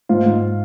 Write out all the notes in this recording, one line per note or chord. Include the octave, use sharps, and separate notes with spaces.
G#2 F4
G#2